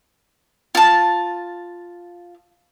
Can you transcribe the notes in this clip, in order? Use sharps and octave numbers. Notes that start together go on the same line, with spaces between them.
F4 A5